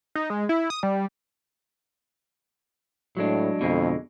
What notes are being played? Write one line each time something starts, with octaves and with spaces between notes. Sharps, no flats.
D#4
G#3
E4
D#6
G3
A2 F#3 G#3 D4
F2 B2 D3 G#3